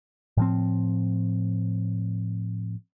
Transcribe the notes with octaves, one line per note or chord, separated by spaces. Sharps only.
A2 F3 C4